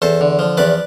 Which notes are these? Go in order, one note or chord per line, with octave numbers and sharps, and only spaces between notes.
E2 A4 C5
D3
F3
E2 B4 D5